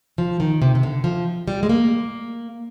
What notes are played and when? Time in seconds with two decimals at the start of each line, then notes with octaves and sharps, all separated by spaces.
0.18 F3
0.40 D#3
0.62 C3
0.75 C3
0.83 D3
1.04 F3
1.48 G3
1.63 G#3
1.69 A#3